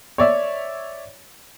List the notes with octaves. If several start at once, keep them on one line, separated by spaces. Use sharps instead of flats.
C#5 D5 E5